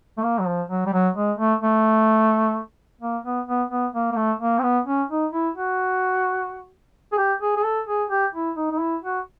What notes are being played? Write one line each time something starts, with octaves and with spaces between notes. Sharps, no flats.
A3
A#3
F#3
F3
F#3
G3
F#3
G#3
A3
A3
A#3
B3
B3
B3
A#3
A#3
A3
A#3
C4
B3
C#4
D#4
E4
F#4
G#4
G4
G#4
G#4
A4
G#4
G4
E4
D#4
D#4
E4
F#4